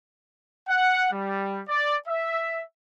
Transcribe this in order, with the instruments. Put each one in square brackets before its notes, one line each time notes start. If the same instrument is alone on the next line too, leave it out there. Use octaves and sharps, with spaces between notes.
[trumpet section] F#5
G3
D5
E5